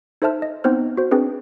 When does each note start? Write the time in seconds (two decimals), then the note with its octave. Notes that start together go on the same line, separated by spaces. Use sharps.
0.22 D#4 A4 C5 E5 A5 F6
0.42 D#5
0.64 B3 C4 D#4 C5 F6
0.97 F#4 C5
1.11 C4 D4 G#4 B4